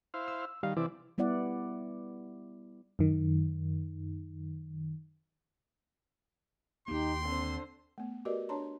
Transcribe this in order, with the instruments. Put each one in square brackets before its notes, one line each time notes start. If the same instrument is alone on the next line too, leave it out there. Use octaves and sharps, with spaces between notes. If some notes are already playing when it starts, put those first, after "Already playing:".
[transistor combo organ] E4 C5 F5
[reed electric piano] E6
[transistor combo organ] D#3 [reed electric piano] G3 F5
[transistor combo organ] C3 E4 D5 [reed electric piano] E3
[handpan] G3 B3 E4 D5 F#5
[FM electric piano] F#2 D#3
[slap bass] D#2 A#3 [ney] D#4 [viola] G4 G5 [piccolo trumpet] C6
[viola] D3 C5 [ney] C4
[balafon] A3 B3
F#4 G4 A#4 B4 D5 D#5
D4 C#5 A5 A#5 C6